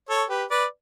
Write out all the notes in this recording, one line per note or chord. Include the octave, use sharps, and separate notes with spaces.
A4 C#5
G4 B4
B4 D5